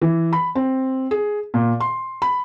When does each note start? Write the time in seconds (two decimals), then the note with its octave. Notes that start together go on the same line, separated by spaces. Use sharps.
0.02 E3
0.33 B5
0.55 C4
1.11 G#4
1.54 A#2
1.80 C6
2.22 B5